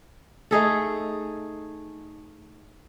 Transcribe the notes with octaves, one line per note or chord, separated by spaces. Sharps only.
A3 D#4 G#4 A4